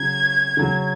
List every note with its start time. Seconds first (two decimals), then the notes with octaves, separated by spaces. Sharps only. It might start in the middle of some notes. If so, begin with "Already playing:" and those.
Already playing: C#3 F#3 C#4 G#6
0.57 C#3 F#3 C#4